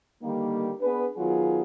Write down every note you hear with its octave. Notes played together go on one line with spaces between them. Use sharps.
D3 D#3 G3 A#3
B3 D4 G#4 B4
D#3 F#3 B3 F4 G#4